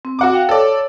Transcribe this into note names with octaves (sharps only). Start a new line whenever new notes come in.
C4
F#4 F#5 D6
F5 G5
A4 C#5 D5